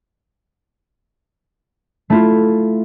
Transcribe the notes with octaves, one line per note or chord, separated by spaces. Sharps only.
A3 E4 F4